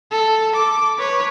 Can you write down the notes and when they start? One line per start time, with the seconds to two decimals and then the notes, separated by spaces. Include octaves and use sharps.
0.12 A4
0.55 D6
0.98 B4 C#5